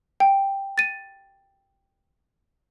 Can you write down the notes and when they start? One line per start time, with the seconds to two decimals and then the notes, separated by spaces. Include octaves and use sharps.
0.20 G5
0.78 A6 D#7